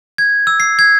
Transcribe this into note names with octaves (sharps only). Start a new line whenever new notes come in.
G#6
E6
C7
G#6